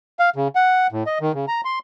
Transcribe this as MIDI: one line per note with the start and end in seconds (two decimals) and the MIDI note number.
0.19 0.30 77
0.36 0.48 49
0.55 0.87 78
0.92 1.03 45
1.06 1.18 75
1.21 1.32 51
1.34 1.45 49
1.48 1.61 82
1.65 1.79 84